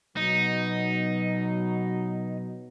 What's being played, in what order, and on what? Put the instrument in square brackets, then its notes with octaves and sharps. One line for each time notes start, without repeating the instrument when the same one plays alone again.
[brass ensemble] B2 F#3 [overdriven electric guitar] D#4